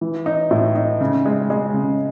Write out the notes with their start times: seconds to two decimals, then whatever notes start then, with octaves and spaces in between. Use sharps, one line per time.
0.01 E3
0.26 D#4
0.51 A2
0.75 D#4
1.01 C#3
1.26 G#3
1.50 G#3
1.74 C#3